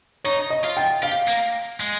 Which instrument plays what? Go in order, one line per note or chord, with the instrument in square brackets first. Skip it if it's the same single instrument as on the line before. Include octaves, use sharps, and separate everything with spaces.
[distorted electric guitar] D#4 [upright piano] C#5
[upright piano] D#5
[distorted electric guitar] F4
[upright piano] G5
[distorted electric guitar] G4 [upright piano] F5
[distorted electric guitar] A#3
G#3